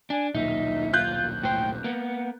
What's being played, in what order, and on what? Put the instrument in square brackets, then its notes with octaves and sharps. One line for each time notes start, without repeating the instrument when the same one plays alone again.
[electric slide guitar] D4 [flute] G#5
[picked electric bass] D#1 B1 A#2 [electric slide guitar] D#4 [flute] E5
[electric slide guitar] F4 [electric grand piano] F#6 G6
[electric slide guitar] A2 C5 [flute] G5
[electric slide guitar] A#3 B3 [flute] F#5